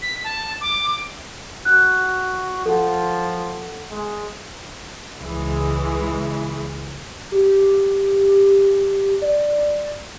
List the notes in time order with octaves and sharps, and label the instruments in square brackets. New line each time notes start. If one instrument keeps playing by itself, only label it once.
[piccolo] B6
A5
D6
[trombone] F#4 [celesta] F#6
[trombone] F3 [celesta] A4 F#5
[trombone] G#3
[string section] C#2 E3 G#3
[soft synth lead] G4
D5